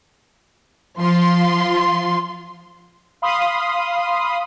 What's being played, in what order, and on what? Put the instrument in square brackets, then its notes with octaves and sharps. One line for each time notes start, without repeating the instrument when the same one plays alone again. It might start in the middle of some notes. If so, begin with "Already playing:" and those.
[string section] F3 F4 C6
[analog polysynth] F5 B5 C6 D#6